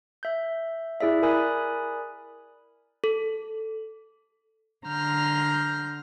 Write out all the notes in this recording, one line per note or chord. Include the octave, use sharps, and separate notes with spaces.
E5 G6
E4 G#4 D5 E5
A#4 D5 G#5 B5 D#6 F#6
A4
D3 A#5 C6 F6 G6